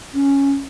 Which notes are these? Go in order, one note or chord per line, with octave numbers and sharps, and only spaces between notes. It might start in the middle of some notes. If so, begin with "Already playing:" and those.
C#4